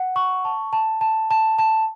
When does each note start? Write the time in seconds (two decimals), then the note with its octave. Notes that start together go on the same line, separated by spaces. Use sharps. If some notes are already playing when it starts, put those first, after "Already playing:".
Already playing: F#5
0.16 C#6
0.45 A5
0.73 A5
1.01 A5
1.31 A5
1.59 A5